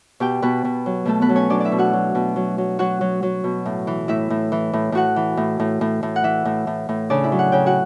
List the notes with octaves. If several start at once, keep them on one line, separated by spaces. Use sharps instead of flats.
B2 G4 G5
B2 B3 B4
B2
F#3
B2 A3 A4
B3 B4
F#3
C#4 C#5
F#3 D4 D5
E4 D5 E5
B2
F#4 F#5
F#3
B2
F#3
F#3
F#3 F#4 F#5
F#3
F#3
B2
A2
E3
A2 E4 E5
A2
E3
A2
A2 F#4 F#5
E3
A2
A2
A2
A2
F#5
E3 E4 E5
A2
A2
A2
C#3 D4 D5
E4 E5
F#3
F#5
C#3 G5
F#4 F#5